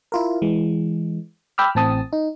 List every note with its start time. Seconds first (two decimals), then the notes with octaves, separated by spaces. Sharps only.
0.12 E4 F4 A#4
0.42 E3 G#3
1.58 G5 B5 D6 E6 F6
1.75 A1 A2 C4 A5 D#6
2.13 D#4